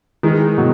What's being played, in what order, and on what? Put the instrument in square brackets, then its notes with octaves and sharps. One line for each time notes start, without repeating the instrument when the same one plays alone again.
[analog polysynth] D#3 [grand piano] E3 G#3
[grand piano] B2 [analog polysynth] F#3